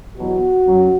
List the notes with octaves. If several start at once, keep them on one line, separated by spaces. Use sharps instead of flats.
E2 B2 F#3 F#4
F#2 F#3